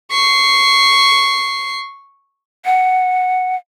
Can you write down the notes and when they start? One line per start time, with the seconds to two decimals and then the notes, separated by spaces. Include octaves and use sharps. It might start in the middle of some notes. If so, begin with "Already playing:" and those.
0.11 C#6 C7
2.65 F#5